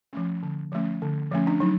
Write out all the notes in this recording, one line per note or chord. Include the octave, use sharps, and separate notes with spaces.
F3 A3 C#4
D3
F3 A3 C#4
D3
F3 A3 C#4
D4
F#3 D#4